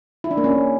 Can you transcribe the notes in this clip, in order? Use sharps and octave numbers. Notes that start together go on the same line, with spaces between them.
E4
D4
A#3
C#4